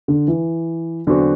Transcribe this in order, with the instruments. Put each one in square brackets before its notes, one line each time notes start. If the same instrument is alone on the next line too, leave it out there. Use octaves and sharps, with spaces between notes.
[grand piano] D3
E3
[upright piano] E2 D3 F#3 C4 F#4 [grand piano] D4